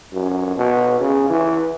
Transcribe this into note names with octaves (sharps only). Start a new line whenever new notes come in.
F#2
B2
C#3
E3